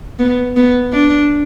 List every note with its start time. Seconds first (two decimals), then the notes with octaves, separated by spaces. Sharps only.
0.19 B3
0.56 B3
0.93 D4